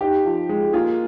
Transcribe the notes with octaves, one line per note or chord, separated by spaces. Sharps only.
D#4 G4
F3
G#3
A#3 F4 G#4